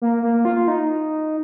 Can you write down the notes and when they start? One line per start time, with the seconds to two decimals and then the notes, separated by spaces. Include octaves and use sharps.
0.02 A#3
0.23 A#3
0.45 F4
0.68 D#4